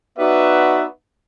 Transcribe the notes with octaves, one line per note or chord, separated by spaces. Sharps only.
B3 D#4 F#4 B4 D5 E5